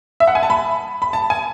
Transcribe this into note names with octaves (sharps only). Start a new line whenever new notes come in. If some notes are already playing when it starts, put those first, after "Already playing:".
E5
F#5
G#5
A5
B5
B5
A5
G#5